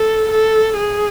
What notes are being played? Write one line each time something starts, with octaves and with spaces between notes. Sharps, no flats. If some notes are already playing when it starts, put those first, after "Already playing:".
Already playing: A4
A4
G#4